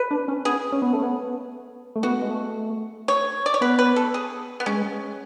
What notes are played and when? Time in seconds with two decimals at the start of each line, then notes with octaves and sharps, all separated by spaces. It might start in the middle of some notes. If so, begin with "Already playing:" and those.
Already playing: B4
0.11 D4
0.28 C#4
0.45 B3 G#4
0.72 C#4
0.82 B3
0.93 A3
1.03 B3
1.96 A3
2.03 B3 F#4
2.22 G#3
2.30 A3
3.08 C#5
3.46 D5
3.54 C#5
3.61 B3 B4
3.79 B4
3.96 A4
4.14 G#4
4.60 B3
4.66 G#3 C#4